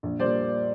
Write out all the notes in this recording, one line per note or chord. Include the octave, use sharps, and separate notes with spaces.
A#1
A#2 G3 C5 D5